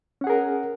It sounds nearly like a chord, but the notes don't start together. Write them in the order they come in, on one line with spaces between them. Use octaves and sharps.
C#4 F#5 G#4 A#4